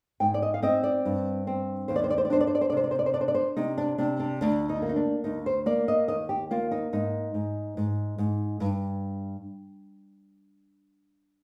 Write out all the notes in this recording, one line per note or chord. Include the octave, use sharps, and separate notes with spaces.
G#2 G5
D5
D#5
F5
C4 D#5
D5
G2
C4
D#2 C5
D5
C5
D5
C5
D5
D4 C5
D5
C5
D5
C5
D5
C3 C5
D5
C5
D5
C5
D4 D5
C5
D5
C5
C3 D#4
D4
C3 D4
D4
D2 D4
D#4
A#3
D#4
D4
D2 D#4
C5
A#3 D5
D#5
D#2 D#5
G4
A#3 F4
D#4
G#2 D#4
G#2
G#2
G#2
G2